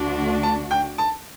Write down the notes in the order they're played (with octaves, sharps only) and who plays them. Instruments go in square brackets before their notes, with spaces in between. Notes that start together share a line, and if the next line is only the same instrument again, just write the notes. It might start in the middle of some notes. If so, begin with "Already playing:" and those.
Already playing: [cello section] D2 D3 A3 D4 F#4
[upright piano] A5
G5
A5